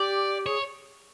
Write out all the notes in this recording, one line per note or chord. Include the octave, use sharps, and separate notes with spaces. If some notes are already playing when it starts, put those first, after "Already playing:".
Already playing: G4 D5
G#4 C#5